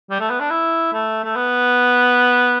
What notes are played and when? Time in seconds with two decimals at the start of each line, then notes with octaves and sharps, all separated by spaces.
0.10 G3
0.20 A3
0.30 B3
0.40 D4
0.50 E4
0.93 A3
1.24 A3
1.36 B3